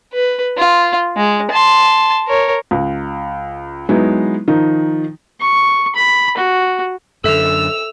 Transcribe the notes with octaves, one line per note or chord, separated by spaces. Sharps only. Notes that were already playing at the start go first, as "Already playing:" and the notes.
B4
F4
G#3
A5 C6
A#4 C#5
C#2
F#3 G#3 B3 D#4 E4
D#3 F3 D#4
C#6
B5
F#4
F#2 D3 A4 E5 E6 F7